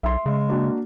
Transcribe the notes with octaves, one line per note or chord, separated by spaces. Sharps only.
B1 E5 C6
C#3 G#3
A#3 D4 F#4